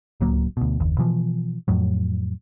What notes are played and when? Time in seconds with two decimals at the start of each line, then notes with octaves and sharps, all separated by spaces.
0.20 D1 C#2 F#3 A#3
0.57 D2 B2
0.80 F#1 D#2
0.98 B2 E3 F3
1.68 F2 A2 F#3